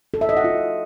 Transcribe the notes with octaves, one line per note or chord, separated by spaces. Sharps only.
A4
E5
D#5
F#5
F4